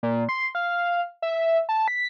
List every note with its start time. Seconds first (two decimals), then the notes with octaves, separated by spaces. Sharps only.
0.03 A#2
0.29 C6
0.55 F5
1.22 E5
1.69 A5
1.88 B6